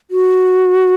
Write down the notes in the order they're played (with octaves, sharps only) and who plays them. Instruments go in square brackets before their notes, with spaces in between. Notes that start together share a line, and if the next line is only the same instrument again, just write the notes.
[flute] F#4